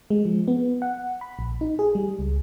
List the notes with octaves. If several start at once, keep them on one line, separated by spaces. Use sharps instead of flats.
G#3
F3
B3
F#5
B5
A#1
D#4
G#4
G3
C#2